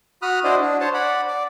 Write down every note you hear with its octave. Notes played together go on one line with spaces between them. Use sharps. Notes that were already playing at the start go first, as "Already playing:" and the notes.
F#4 B5 D#6 F6 F#6
D4 E4 F#4 C5 D5 D#5
D4
C5 C#5 A5
D5 F#5 B5
D5